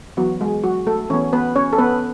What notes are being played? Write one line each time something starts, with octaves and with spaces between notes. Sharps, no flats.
E3 F#3 B3 F#4
G#3 G#4
F#3 F#4
A3 A4
E3 B3 C#4 C#5
B3 B4
C#4 C#5
A4
B3 B4